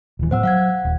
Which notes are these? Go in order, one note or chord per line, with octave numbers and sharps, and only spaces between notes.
D#1 E3
A2 F3 B3 C5 F#5 E6
F#3 F5 F#5 G#6
D#1